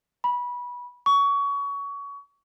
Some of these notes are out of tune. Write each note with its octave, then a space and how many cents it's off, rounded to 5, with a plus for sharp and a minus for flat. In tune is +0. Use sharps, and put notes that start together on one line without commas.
B5 -20
C#6 +25